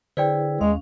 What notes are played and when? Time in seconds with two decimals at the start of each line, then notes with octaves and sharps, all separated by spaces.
0.17 D3 E4 G#4 B4 C5 D5 G5
0.61 D#2 G#3 C#4 F5